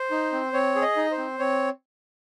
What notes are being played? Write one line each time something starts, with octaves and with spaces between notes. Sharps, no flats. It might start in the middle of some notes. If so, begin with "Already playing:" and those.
Already playing: C5
D#4
C4
C4 C#5
G#4
D#5
D#4
C5
C4
C4 C#5